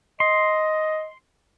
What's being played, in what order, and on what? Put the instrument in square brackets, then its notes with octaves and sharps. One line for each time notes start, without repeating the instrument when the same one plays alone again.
[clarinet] D#5 [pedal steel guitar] C6